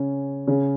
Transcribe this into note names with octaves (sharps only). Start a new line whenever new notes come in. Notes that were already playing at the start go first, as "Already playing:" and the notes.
Already playing: C#3 C#4
C#3 C#4